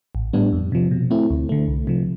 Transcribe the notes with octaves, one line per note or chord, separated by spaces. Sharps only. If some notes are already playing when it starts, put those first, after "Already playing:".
A1
A2 G3 B3 D4
F2
C3 F3
B2
A3 C4 E4
D2
D3 A3
C2
C3 F3